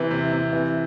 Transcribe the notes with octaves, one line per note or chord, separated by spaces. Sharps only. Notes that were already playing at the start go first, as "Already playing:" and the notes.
Already playing: C3 E3
C3
C3
E3